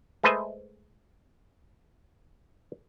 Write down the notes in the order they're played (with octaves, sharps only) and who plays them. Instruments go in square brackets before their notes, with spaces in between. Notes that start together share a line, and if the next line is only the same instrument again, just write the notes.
[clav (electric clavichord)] G#3 A3 B4 C5 D#5 E5